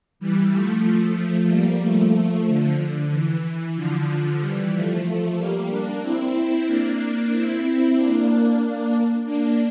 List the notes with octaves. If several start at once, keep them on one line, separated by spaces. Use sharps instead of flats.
E3 G3
F3 A3
G3 A#3
F3 A3
D3 F3
D3
E3
D3 F3
E3 G3
F3 A3
F3 A3
G3 A#3
A#3 D4
C4 E4
A#3 D4
C4 E4
A#3 D4
A#3 D4